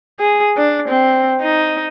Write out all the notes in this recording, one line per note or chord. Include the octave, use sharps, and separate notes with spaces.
G#4
D4
C4
D#4